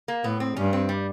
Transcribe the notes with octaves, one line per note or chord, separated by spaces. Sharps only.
A#3
A2 B3
C4
G2 C#4
C4
G3